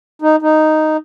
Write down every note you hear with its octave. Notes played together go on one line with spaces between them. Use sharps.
D#4
D#4